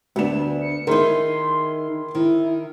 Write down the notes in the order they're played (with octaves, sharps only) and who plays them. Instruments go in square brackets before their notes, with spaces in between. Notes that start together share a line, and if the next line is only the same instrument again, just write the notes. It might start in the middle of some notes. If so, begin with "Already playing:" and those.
[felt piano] D2 E7 [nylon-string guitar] B3 D4
[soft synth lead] C#7
[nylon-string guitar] D#3 D#4 [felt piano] E4 G#4 A#4 [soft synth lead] C6
[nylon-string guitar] D#3 [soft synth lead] E4